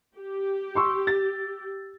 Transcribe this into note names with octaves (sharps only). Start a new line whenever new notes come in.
G4
C6 C#6 E6
A6